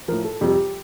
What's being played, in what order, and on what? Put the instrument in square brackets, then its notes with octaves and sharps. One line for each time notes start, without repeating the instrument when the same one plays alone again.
[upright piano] A2 F3 A#4
A4
F2 C3 G3 G4